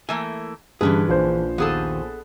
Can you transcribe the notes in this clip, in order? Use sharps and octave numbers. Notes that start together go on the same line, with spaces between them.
E3 A3 A#3 G#5
G2 D3 E3 C#4 G#4 B4
A#1 F3 C5
D#2 B3 G#4 A4